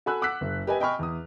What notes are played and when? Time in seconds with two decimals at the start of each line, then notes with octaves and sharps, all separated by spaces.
0.06 F#4 A4 G#5 B5 E6 F#6
0.22 F#5 D6 E6 F#6 B6
0.41 F#1
0.67 G4 B4 D#5 G#5
0.80 D#5 G5 G#5 B5 C#6 F6
0.99 E2 D#6